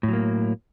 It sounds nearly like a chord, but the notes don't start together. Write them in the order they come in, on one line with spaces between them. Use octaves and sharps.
A2 F#3 A#3